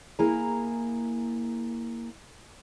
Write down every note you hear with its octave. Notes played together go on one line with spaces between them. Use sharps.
A#3 E4 G#4 G#5 A#5